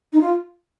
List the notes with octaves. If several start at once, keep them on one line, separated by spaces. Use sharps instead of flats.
D#4
F4